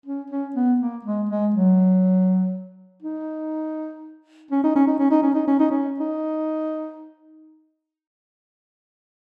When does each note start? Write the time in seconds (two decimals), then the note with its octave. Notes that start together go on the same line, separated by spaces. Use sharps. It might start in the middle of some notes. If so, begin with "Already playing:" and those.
0.05 C#4
0.30 C#4
0.55 B3
0.80 A#3
1.05 G#3
1.29 G#3
1.54 F#3
3.02 D#4
4.51 C#4
4.64 D#4
4.75 C#4
4.87 D#4
4.99 C#4
5.11 D#4
5.22 C#4
5.34 D#4
5.47 C#4
5.59 D#4
5.71 C#4
5.99 D#4